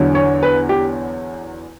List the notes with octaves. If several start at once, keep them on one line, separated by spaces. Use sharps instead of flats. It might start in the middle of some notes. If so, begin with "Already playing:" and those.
Already playing: E2 D3 F#3
C#5
B4
G4